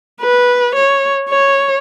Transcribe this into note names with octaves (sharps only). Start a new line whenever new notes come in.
B4
C#5
C#5